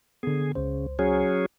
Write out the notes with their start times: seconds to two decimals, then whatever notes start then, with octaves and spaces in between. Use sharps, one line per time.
0.23 D3 B3 G#4
0.55 C#2 C#3 C5
0.99 F#3 C#4 G#4